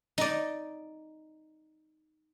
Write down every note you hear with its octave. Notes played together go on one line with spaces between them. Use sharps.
D#4 D5